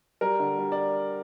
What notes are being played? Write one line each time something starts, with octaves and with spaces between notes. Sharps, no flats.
G3 A#4
D3
G3
D5